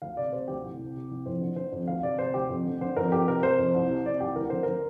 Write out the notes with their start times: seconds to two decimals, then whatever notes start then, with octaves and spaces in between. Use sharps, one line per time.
0.02 D2 F5
0.17 C3 D5
0.32 C3 C5
0.48 D2 G4
0.64 C2
0.79 C3
0.95 C3
1.11 C2
1.26 F2 C5
1.41 D3
1.56 D3 C5
1.72 F2
1.88 D2 F5
2.03 C3 D5
2.19 C3 C5
2.34 D2 G4
2.50 F2
2.65 D3
2.81 D3 C5
2.96 F2 A#4
3.12 F2 G4
3.28 C3 A#4
3.43 C3 C5
3.59 F2
3.74 C2
3.90 C3
4.06 C3 D5
4.20 C2 G4
4.36 D2 A#4
4.50 D3 C5
4.63 D3 A#4